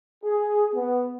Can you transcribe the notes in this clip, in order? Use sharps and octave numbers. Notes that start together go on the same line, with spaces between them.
G#4
B3